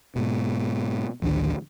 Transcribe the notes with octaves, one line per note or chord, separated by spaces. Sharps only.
G#2 B2
A1 D2 D#3 D4